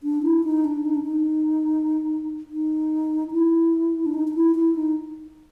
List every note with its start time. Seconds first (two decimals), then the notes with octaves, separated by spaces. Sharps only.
0.03 D4
0.23 E4
0.44 D#4
0.64 D4
0.85 D#4
0.94 D4
1.03 D#4
2.50 D#4
3.32 E4
4.06 D4
4.14 D#4
4.27 D#4
4.34 E4
4.55 E4
4.75 D#4